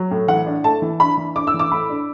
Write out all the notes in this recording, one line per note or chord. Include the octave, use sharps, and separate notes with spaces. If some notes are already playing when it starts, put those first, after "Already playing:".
Already playing: F#3
A2
E3 F#5
D4
A3 A5
E3
D4 B5
E3
D4 D6
E6
E3
D6
A2 B5
D4